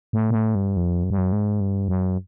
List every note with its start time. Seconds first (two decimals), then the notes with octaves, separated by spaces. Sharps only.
0.13 A2
0.30 A#2
0.35 A2
0.55 G2
0.77 F2
1.04 F#2
1.10 G2
1.18 F#2
1.32 G#2
1.60 G2
1.88 F#2